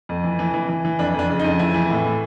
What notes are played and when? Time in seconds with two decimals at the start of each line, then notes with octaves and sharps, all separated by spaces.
0.09 F2
0.24 E3
0.39 E3
0.54 E3
0.69 E3
0.85 E3
0.99 F2 D4
1.14 F2 D4
1.30 C#3
1.39 D#4
1.44 F2
1.59 E3 E4
1.74 E3
1.90 A2
2.04 A2